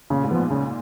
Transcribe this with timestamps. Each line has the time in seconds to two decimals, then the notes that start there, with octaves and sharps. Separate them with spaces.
0.10 A#2 C#3
0.24 G#2
0.31 F3 B3
0.38 A#2
0.50 C#3